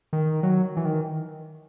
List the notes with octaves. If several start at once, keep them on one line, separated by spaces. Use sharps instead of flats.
D#3
F#3
E3
D#3